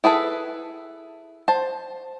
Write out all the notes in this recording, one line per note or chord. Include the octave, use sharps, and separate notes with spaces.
E4 G#4 A4 B4
C5 A5